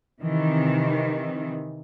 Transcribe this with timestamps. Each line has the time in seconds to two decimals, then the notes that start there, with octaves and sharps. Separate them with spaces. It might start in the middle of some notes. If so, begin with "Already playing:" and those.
0.22 C3 D#3 E3